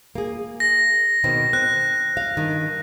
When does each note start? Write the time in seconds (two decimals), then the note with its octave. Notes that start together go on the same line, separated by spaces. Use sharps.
0.15 A#3 G#4
0.60 A#6
1.24 B2 D#3 C4
1.53 C4 F#6
2.17 F5
2.37 G2 D#3